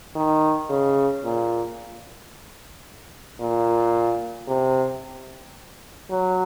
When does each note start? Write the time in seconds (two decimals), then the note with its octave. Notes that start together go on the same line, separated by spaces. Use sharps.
0.16 D#3
0.70 C#3
1.24 A#2
3.40 A#2
4.48 C3
6.10 F#3